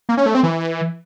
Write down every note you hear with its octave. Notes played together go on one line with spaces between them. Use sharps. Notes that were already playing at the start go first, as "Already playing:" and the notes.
A#3
C#4
A3
C4
E3